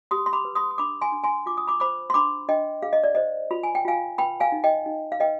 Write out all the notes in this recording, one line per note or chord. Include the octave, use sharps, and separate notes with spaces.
G4 C6 D#6
C6
B5 D6
B4
C6 D#6
D#6
D4 B5 D6
G#5 C6
D4
G#5 C6
F4 D6
D#6
B5 D6
C5 B5 D6
C6
D4 B5 D6
D4 D#5 G5
G#4 F5
D#5
D5
C5 D#5
F4 B5
G#5
G5
F4 F5 G#5
B4 G5 B5
F5 G#5
D#4
D#5 G5
D#4
F5
B4 D#5 G5